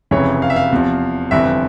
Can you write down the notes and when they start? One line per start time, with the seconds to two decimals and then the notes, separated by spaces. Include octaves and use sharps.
0.11 F1 F2 C#3 E3 C#5
0.42 F5
0.50 E5
0.56 F5
0.72 E2 C3 F3
1.31 G1 F2 C3 E3 E5